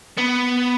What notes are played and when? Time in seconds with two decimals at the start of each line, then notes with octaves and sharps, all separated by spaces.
0.17 B3